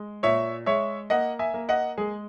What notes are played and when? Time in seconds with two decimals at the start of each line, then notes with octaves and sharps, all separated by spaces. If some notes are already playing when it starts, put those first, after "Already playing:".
Already playing: G#3
0.23 A#2 C#5 E5
0.66 G#3 C#5 E5
1.10 A#3 D#5 F#5
1.39 E5 G#5
1.54 A#3
1.69 D#5 F#5
1.98 G#3 G#4